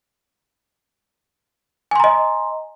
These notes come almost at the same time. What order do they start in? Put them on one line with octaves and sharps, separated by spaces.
G#5 C6 A#5 D#5